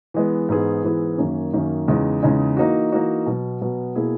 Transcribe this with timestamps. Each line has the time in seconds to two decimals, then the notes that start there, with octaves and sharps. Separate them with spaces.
0.14 E3 G#3 B3
0.49 G#2 E3 B3 E4 G#4
0.84 G#2 E3 B3 E4 G#4
1.18 F#2 D#3 A#3 C#4
1.53 F#2 D#3 A#3 C#4
1.88 E2 C#3 G#3 D#4
2.23 E2 C#3 G#3 D#4
2.57 E3 A#3 D#4 F#4
2.92 E3 A#3 D#4 F#4
3.26 B2 F#3 B3
3.61 B2 F#3 B3
3.96 B2 A#3 E4 G#4